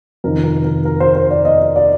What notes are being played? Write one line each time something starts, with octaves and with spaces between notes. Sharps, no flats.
F2 C3 D#3 A#4
A#4
A#4
A#4
C5
C5
D5
D#5
D5